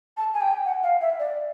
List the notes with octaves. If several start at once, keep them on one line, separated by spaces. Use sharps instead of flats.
A5
G#5
G5
F#5
F5
E5
D5